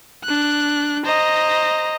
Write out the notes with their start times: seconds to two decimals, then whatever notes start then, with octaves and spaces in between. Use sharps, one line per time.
0.25 D4 F#6
1.06 C5 D#5 A#5